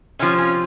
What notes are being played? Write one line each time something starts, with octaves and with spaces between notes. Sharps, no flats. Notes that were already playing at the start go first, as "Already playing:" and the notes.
C3 F3 C#4
C#4